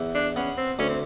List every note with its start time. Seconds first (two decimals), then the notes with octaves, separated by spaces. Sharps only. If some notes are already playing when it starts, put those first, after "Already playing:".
Already playing: E2
0.15 D4
0.36 B3 C#4
0.57 C4
0.79 D2 C#4
0.89 C4